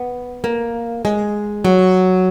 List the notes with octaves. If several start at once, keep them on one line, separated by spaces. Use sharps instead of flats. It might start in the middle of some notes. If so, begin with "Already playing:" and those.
Already playing: B3
A#3
G#3
F#3